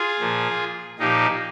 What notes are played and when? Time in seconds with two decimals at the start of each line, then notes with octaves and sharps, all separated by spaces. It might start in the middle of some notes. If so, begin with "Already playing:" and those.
Already playing: F4 G#4
0.20 A#2 F3
0.99 A#2 F3 D#4 G4